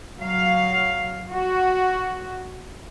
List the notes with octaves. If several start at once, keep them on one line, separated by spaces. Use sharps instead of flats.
F#3 F5
F#4